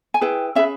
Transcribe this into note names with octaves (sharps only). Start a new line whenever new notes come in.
G#5
E4 G#4 B4 G5
C#4 G#4 B4 E5